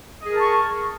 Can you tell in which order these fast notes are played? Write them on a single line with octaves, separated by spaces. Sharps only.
D#5 G#4 A#4 A5 C#6